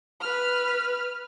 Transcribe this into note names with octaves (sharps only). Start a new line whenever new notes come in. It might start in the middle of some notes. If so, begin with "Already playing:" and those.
B4 F6